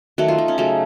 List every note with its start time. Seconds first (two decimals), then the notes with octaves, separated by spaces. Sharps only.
0.18 D#3 F#3 A3 F#4
0.28 F4
0.38 D#4
0.48 C#4
0.58 C#3 F#3 A3 D#4